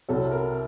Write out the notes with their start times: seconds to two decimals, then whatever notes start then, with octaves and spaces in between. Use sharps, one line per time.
0.08 C2 C3 F#3 C4 A4
0.31 A#4